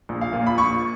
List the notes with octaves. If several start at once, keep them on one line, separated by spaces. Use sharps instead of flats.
A#1
F5
A#2
B5
A#1 C#6